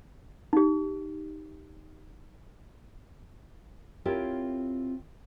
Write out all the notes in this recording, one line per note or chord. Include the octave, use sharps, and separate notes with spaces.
D#4 G4
C4 E4 F4 G4 A#4 C#5